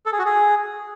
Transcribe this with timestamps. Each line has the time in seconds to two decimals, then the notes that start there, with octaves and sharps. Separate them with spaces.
0.06 A4
0.12 G#4
0.19 F#4
0.25 G#4